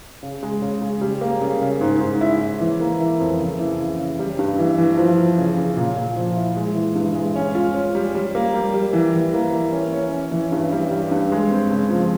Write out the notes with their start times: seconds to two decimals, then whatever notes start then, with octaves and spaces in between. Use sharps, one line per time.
0.23 C#3
0.43 G#3
0.62 C#3
0.82 C#3
1.01 G3
1.21 A#3
1.41 C#3
1.61 C#3
1.81 G#2
2.01 G#2
2.21 E4
2.40 E4
2.60 E3
2.80 A#3
3.00 E3
3.20 F2
3.40 C#3
3.59 E3
3.79 C#3
3.99 C#3
4.19 G3
4.39 G2
4.59 E3
4.78 E3
4.97 F3
5.18 F3
5.38 C#3
5.57 C#3
5.77 A#2
5.96 A#2
6.16 F3
6.36 E4
6.56 G#3
6.75 E3
6.95 G2
7.15 G#3
7.36 C#4
7.55 F4
7.74 C#4
7.95 G3
8.15 G3
8.35 A#3
8.54 G3
8.74 G3
8.93 E3
9.14 E3
9.33 A#3
9.53 E3
9.72 C#4
9.93 C#4
10.12 C#4
10.32 E3
10.52 G2
10.72 G3
10.91 G3
11.11 G2
11.32 G#3
11.51 C4
11.70 C#3
11.90 F3